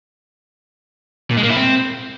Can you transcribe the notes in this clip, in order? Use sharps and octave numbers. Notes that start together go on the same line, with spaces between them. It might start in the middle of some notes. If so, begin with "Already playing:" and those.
A#2
G#3
A#3
E4
C4